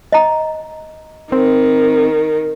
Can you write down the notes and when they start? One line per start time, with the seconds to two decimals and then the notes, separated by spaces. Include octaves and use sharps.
0.12 D#5 A#5
1.32 D#3 C4